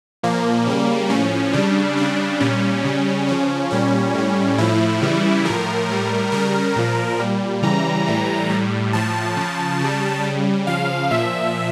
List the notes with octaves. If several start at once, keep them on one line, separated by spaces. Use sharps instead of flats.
A#2 F3 A#3
C#3 G3
A2 F3 C#4
C#3 G3 D4
C#3 G3 D4
A#2 G3 C#4
C#3 G3
C#3 F3 C#4
A#2 G3 C#4
A2 G3
A2 F3 E4
C#3 E3 G3
A2 F3 A#4
A2 G3
C#3 G3 A#4
A#2 F3
A#2 G3
C#3 E3 G3 A#5
A2 E3 G3
A2 G3
A2 F3 A5
C#3 F3
C#3 G3
C#3 G3
C#3 F3 F5
A#2 F3 E5